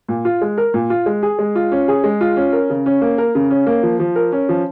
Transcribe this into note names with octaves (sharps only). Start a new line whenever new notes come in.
A#2
F4
G#3
A#4
A#2
F4
G#3
G#4
G#3
F4
C#4
G#4
G#3
F4
C#4
A#4
C#3
C#4
A#3
A#4
C#3
C#4
A#3
F3
F3
A#4
C#4
F3